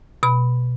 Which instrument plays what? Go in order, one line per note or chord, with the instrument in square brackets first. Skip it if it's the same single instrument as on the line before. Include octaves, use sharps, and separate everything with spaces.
[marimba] B2 B5